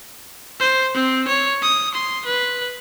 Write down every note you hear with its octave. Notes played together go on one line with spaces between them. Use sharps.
C5
C4
C#5
D#6
C6
B4